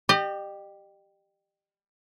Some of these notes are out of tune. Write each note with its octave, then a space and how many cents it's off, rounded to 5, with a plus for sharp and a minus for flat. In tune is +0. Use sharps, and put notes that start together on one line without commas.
G4 +0 D#5 -45